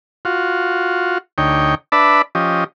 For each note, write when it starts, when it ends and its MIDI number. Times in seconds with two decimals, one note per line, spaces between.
0.25 1.18 65
0.25 1.18 66
1.38 1.75 38
1.38 1.75 63
1.38 1.75 73
1.38 1.75 79
1.92 2.22 62
1.92 2.22 71
1.92 2.22 74
1.92 2.22 76
1.92 2.22 81
1.92 2.22 83
2.35 2.64 53
2.35 2.64 61
2.35 2.64 67
2.35 2.64 75